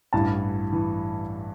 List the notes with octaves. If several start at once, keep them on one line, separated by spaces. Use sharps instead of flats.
A1 G2 E3 A5
E3